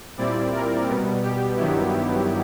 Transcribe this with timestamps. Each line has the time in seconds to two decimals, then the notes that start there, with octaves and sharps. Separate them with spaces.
0.17 A#2 G3 C4 E4 D5
0.53 A#4
0.87 B2 G3 B3
1.22 G4
1.57 G2 D#3 F#3 B3 E4